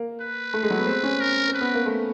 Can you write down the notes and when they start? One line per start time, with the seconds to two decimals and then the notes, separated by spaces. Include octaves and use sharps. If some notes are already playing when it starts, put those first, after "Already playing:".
Already playing: A#3
0.21 B4
0.54 A3
0.63 G#3
0.70 F#3
0.79 B3
0.87 C4
1.03 C#4
1.21 A#4
1.49 C4 B4
1.61 B3
1.74 A#3
1.86 A3